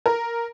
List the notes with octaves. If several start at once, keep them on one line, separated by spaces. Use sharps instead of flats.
A#4